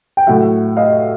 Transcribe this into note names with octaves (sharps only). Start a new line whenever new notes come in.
G5
A2 F#3 E5 F#5
D#5 F5